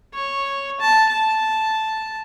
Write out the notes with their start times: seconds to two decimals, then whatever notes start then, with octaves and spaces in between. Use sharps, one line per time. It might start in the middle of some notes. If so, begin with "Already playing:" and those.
0.14 C#5
0.80 A5
1.10 A5